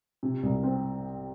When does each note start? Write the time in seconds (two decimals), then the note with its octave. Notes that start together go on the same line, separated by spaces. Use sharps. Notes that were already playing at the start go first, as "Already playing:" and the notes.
0.23 C3
0.43 C2
0.63 C4